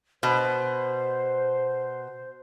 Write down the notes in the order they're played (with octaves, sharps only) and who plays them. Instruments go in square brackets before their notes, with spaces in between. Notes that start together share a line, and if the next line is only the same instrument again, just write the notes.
[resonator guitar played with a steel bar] B2 [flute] C5